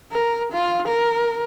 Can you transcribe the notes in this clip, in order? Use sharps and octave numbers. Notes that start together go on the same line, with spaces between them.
A#4
F4
A#4